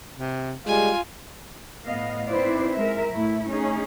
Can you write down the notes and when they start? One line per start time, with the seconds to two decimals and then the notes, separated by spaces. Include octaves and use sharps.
0.15 C3
0.66 G3 G#3 F4 G#5
1.86 A2 B3 D#5 F5
2.30 C4 D#4 E4 B4 C5 D5
2.77 G#3 A#4 E5
3.12 A2 A3 E4
3.48 A3 C#4 D#4 G#4